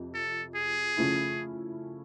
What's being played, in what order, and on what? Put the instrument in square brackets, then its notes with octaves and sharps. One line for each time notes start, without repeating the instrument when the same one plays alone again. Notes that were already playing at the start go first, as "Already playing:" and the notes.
Already playing: [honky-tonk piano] F2 C3
[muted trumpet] A4
G#4
[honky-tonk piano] C#3 F3 A3 C#4 E4